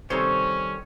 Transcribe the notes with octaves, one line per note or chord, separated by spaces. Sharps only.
C3 D#3 G3 C#4 D#4 A4 C5 C#5